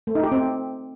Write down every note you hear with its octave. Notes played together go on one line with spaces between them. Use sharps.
A3
D#4
G4
C4